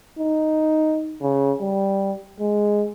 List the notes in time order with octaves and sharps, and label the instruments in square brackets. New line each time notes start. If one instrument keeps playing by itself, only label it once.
[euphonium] D#4
C#3
G3
G#3